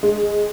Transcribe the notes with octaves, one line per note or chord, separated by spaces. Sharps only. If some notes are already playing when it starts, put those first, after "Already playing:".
G#3